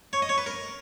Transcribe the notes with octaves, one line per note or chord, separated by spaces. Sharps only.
C#5
D#5
C#5
B4
A#4